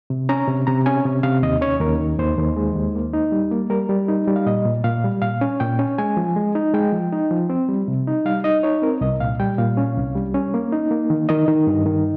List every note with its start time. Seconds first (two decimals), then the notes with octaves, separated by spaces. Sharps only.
0.10 C3
0.29 C#4 A#5
0.48 C3
0.67 C3 A#5
0.86 C#4 G#5
1.05 C3
1.23 C3 F5
1.43 D#2 D#5
1.61 C#4 C#5
1.80 D#2 A#4
2.00 D#3
2.19 D#2 C5
2.38 D#2
2.56 G#3
2.75 D#2
2.95 A#3
3.13 D#4
3.32 G3
3.52 A#3
3.70 G3 A#4
3.89 G3
4.08 D#4
4.27 G3
4.36 F5
4.46 A#2 D#5
4.65 A#2
4.84 A#2 F5
5.04 G3
5.22 A#2 F5
5.41 C#4
5.60 A#2 G5
5.79 C#4
5.98 G#3 G#5
6.17 F3
6.36 G#3
6.55 D#4
6.74 G#3 G5
6.93 F3
7.12 D#4
7.31 F3
7.50 C4
7.69 G3
7.88 C3
8.07 D#4
8.25 G3 F5
8.44 D#4 D#5
8.63 D#4 C#5
8.82 C4 A#4
9.01 C2 D#5
9.20 A#2 F5
9.40 G3 G5
9.58 A#2 F5
9.77 C#4
9.97 C2
10.15 G3
10.34 C#4
10.54 A#3
10.73 D#4
10.91 A#3
11.10 D#3
11.29 D#3 D#5
11.48 D#3
11.67 G2
11.86 D#3